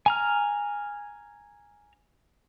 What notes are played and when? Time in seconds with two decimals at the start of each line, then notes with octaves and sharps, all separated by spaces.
0.06 G#5 A#5 F6